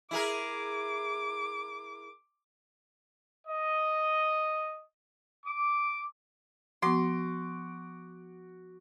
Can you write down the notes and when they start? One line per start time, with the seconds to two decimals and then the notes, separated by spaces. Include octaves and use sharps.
0.11 E4 G#4 A#4 D6
3.46 D#5
5.44 D6
6.82 F3 B3 F#4 C6 D6